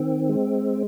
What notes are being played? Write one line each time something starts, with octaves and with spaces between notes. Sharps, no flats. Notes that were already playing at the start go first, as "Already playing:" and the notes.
Already playing: D#3 C4
G#3